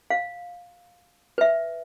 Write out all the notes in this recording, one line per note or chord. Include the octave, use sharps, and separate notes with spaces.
F5
B4 E5